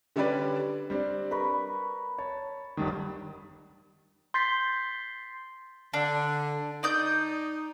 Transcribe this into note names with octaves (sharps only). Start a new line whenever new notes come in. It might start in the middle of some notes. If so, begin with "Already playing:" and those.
D3 G3 C#4 D4 B4 D5
G3 C4 D4
A#4 B4 B5 C#6
C#5 A5
G1 G2 D#3
C6 G6 A6 B6 C7
D3 D4
D#4 D5 D#6 G6